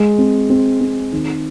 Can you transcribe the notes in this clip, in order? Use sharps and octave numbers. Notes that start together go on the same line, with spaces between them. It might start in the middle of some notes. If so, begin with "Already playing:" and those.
Already playing: G#3
C4
C4
C4
D#3